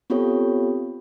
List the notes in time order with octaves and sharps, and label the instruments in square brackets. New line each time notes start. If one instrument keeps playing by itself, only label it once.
[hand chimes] B3 C4 F4 G4 A4 C#5